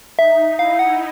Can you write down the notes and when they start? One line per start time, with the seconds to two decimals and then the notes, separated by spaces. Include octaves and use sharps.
0.19 D#4 E5
0.59 E4 F5
0.79 F#5